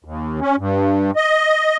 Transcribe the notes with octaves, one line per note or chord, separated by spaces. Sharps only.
D#2
C#4
G2
D#5